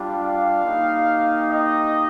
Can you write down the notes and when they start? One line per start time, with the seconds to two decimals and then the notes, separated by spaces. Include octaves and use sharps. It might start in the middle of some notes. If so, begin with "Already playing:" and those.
Already playing: G3 D4 F4
0.22 F5
0.63 A#3 D#4 G4
1.48 D#5